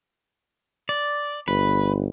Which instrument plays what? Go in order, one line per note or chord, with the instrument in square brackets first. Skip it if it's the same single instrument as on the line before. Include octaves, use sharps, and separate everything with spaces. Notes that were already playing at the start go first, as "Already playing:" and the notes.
[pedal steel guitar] D5
[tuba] G1 [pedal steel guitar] B4